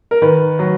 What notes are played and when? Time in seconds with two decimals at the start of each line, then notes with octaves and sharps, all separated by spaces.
0.11 A#4
0.22 D#3 B4
0.59 F#3